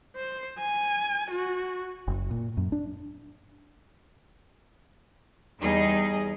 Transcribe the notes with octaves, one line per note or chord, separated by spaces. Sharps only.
C5
G#5
F#4
F#1
A#2
F#2
D4
E2 G3 D#4 G#4 D#5